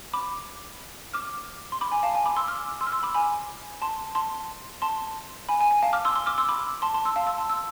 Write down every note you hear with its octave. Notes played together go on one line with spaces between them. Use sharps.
B5 D6
D6 F6
C6
B5 D6
G#5 B5
F5 A5
G#5
B5 D6
C6 E6
D6 F6
C6 E6
F6
C6 E6
B5 D6
G#5 B5
A5 C6
A5 C6
A5 C6
G#5 B5
G#5
G#5
F5 A5
D6 F6
C6 E6
C6 E6
D6 F6
C6 E6
B5 D6
A5 C6
A5 C6
C6 E6
F5 A5
C6 E6
A5 C6
E6